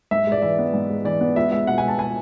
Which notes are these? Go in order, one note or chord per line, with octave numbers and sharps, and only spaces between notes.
G#2 E5
G#3 D5
E3 E5
B3
G#2
G#3
E3 D5
B3
C#2 E5
G#3 E5
B2 F#5
G#5
C#2
A5
G#5